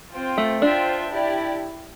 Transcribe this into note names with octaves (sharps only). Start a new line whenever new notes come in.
C4 F4 C5 G5
A3
D4 F4 C5 E5 G5
E4 G4 D5